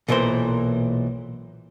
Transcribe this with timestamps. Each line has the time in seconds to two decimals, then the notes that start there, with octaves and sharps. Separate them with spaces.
0.08 B1 A#2 E3 A#4 C5